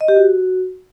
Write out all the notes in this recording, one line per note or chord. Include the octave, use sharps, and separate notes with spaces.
D#5
G4
F#4